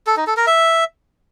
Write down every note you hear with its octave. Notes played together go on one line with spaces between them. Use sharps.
A4
D#4
A4
A#4
E5